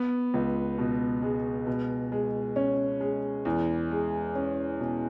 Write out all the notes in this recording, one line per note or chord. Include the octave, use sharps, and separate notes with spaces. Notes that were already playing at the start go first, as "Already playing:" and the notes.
Already playing: B3
C#2
B2
G#3
B2
G#3
C#4
G#3
E2
G#3
C#4
B2